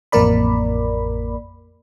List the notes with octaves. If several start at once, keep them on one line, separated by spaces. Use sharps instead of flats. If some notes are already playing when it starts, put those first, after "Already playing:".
A1 F2 A#3 A#4 D5 B5